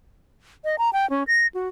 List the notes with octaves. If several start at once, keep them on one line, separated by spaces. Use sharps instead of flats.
D#5
A#5
G5
C#4
A#6
F#4